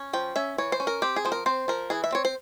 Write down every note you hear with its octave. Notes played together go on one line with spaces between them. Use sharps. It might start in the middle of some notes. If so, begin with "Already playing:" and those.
Already playing: C#4
F3 G5
C#4 E5
E3 C#5
C5
C#4
A#4
C4 G4
G#4
F3 C5
A#4
C4 C5
F3 A#4
E3 G#4
E5
C4 C#5
C5